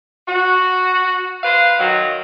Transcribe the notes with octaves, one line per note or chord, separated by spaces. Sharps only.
F#4
B4 C5 F5
D#3 F#3